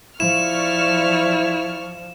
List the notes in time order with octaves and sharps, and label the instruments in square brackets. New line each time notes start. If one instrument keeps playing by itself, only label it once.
[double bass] F3 [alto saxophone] E4 [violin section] D5 C#6 F6 [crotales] E7